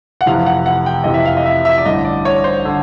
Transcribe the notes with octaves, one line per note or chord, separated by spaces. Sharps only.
F#5
F1 F2 C3 E3 F5
F#5
F#5
G5
F1 F2 C3 E3 D#5
E5
F5
D#5
E5
E5
D5
A1 G2 D3 D#5
D5
C#5
C5
D3